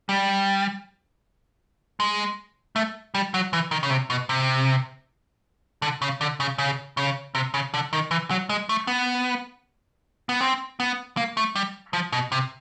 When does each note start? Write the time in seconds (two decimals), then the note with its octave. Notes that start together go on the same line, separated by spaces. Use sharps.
0.09 G3
2.00 G#3
2.76 A3
3.15 G3
3.34 F#3
3.53 E3
3.71 D#3
3.83 C#3
3.90 C3
4.10 B2
4.29 C3
5.82 D3
6.02 C#3
6.21 D3
6.40 C#3
6.58 C#3
6.97 C#3
7.35 C3
7.54 C#3
7.74 D3
7.93 D#3
8.11 E3
8.30 F#3
8.49 G#3
8.69 A3
8.87 B3
10.29 B3
10.41 C4
10.80 B3
11.17 A#3
11.37 A3
11.56 G3
11.93 F3
12.12 B2
12.32 C3